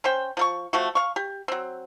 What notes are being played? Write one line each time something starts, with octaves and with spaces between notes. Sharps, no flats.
C#4 C5 G5
F3 A4 C#6
F3 A3 F#4
F5 C#6
G4
F#3 C4